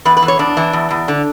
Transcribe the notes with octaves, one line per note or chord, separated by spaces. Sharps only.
E2 B4
B4
E3
C#5
E2 D4
E3
E2
E2
D3